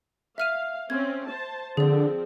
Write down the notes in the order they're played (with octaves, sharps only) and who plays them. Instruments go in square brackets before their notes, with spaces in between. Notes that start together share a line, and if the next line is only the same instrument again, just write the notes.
[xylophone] E5 F6 D#7 [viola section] F5
[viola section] C4 C#4 [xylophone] G#6
[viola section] C5 A5
[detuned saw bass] D3 [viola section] F3 C4 [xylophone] G#4 D5